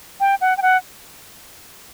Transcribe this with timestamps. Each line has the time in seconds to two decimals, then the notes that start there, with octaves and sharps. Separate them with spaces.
0.20 G5
0.41 F#5
0.57 G5
0.62 F#5